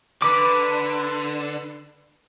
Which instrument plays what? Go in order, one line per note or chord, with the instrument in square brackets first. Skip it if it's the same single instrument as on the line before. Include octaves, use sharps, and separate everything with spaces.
[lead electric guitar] D3 [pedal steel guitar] B4 D6